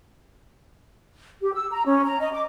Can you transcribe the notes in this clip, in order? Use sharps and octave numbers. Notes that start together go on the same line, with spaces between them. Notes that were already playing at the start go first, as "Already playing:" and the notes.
G4
E6
A#5
C#4
A#5
D#5
D6